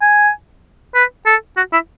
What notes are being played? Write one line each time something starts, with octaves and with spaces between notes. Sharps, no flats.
G#5
B4
A4
F#4
E4